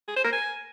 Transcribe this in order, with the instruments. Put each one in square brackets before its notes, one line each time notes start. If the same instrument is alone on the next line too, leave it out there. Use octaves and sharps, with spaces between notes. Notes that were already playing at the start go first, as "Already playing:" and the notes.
[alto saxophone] G#4
C5
A#4
G#5